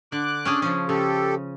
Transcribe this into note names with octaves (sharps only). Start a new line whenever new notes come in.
D3 D6 F#6
C#4 D4 G#4
C#3 F3 C#4
C#3 G4 A4